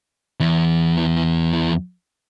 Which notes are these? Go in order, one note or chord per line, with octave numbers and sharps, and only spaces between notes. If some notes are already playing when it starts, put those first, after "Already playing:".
E2 E3